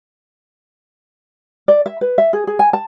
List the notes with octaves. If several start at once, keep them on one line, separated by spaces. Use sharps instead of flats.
D5
E5
B4
E5
G#4
G#4
G#5
A5